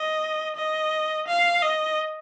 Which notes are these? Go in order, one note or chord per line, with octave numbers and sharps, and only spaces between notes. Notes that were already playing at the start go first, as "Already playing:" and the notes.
Already playing: D#5
D#5
F5
D#5